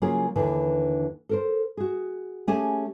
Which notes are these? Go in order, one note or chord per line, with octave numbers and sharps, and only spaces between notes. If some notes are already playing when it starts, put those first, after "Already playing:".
C#3 F#3 A#3 C#4 F4 G#4
D#2 D3 E3 D4 B4
A4 A#4 C5
F#4 G#4
A3 C#4 G4 G#4 G#5 A5